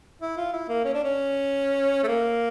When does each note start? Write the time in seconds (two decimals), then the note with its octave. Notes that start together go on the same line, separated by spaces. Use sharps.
0.22 E4
0.37 F4
0.53 E4
0.69 A#3
0.84 C#4
0.94 D4
1.04 C#4
2.04 A3
2.08 A#3